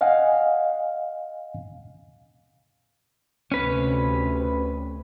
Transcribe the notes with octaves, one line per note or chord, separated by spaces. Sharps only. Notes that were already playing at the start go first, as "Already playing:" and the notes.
D#5 F5 F#5 G#5
D2 C3 C#4 B4